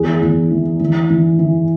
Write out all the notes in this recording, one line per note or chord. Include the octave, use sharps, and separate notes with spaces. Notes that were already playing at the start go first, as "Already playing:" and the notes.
Already playing: E2 G#4
E2
E3
E3
E3
E3